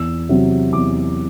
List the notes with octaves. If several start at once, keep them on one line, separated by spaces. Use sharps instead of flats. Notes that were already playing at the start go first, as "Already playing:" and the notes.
Already playing: E2 E6
C3 F#3
E2 D6